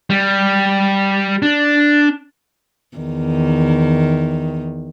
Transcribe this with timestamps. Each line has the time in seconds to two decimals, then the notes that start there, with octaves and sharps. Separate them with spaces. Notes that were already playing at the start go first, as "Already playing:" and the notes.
0.10 G3
1.42 D4
2.97 E2 D#3